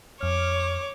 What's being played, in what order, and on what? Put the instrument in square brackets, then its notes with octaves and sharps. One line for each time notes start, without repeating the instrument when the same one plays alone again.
[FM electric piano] F2 F6 [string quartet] C#5 D6